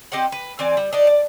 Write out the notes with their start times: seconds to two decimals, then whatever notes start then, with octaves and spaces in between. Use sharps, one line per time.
0.12 C4 G4 D#5 F#5
0.32 B4
0.59 E3 C4 D5 G#5
0.77 G3
0.93 D4 D#4 D5
1.07 D5